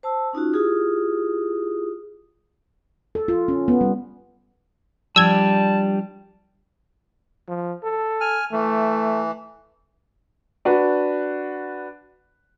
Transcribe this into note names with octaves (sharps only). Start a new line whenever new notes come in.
C5 A5 E6
C#4 D#4 F4 F#4
E4 F4 G4 G#4 D#6
A4
F4
C#4
B3
G3
F3 G3 D4 A5 E6 G#6
F3
A4
G#5 F6
E3 A3
D4 F#4 B4